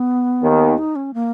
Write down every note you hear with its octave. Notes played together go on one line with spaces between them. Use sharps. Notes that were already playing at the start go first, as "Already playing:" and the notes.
Already playing: B3
D#2 D#3
D#4
C#4
A#3